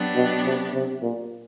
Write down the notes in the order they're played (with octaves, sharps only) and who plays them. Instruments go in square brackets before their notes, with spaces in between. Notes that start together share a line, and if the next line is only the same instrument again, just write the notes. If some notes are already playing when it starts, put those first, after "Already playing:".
Already playing: [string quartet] F#3 B3 D4 G4
[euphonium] B2
C3
C3
A#2